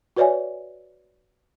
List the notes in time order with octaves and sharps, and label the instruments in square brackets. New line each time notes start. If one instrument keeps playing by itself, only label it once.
[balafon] F#4 B4 C#5 D5 E5 G#5